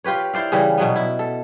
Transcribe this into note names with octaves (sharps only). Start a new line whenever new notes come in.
F4 G4 B4 C#5
E4 C5 D5 F5
C#3 E3 G3 E4
B2 F#3 B3
E4
A4